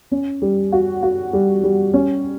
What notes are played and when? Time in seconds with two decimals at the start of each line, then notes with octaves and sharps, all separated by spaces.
0.12 C#4
0.42 G3
0.72 F#4
1.03 F#4
1.33 G3
1.64 G3
1.94 C#4